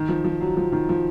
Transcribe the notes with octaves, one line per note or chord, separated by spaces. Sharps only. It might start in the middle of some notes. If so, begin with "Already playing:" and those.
Already playing: D#3
F3
F3
F#3
F3
D#3
F3